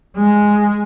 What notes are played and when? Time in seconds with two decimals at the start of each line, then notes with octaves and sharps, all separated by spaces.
0.16 G#3